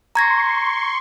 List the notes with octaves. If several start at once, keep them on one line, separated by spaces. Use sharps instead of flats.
A#5 C6 C#6 G#6 A#6